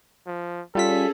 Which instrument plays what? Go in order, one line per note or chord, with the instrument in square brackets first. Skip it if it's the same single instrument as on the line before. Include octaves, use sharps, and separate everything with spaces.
[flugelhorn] F3
[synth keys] G3 F4 B6 [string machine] C#4 G#4 [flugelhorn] A4